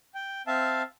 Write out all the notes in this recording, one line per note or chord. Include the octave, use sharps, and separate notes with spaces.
G5
C4 E5 F5 A5